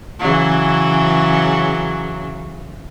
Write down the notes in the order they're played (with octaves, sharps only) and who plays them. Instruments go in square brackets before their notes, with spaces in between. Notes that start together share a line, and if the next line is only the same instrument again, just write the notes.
[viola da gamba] C#3 E3 F#3